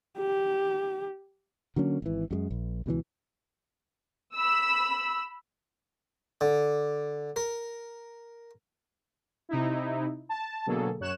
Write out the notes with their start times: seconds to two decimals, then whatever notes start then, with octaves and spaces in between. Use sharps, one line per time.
0.18 G4
1.76 D3 F#3 A#3 C#4
2.02 G#1 E3
2.31 F#2 G3 G#3
2.51 A#1
2.86 C#2 B2 D3 E3
4.36 B5 E6
6.41 D3
7.36 A#4
9.49 C3 D#4 E4
10.29 A5
10.66 B2 D3 F#3 A#3 G#4 A4
11.00 F#2 C#5 F#6 E7